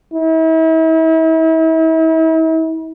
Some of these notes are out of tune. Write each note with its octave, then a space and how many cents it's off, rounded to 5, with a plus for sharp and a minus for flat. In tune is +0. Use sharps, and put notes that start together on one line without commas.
E4 -40